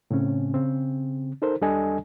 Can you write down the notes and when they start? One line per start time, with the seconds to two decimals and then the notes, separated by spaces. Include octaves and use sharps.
0.11 A2 C#3 C4 C#4
0.54 C#3 C4
1.42 D#4 A4 A#4 C5
1.61 D#2 G3 D4 A4 D#5 G#5